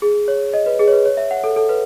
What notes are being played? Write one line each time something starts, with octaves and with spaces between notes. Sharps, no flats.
G#4
C#5
D#5
B4
G#4
C#5
B4
C#5
E5
F#5
A4
A4
B4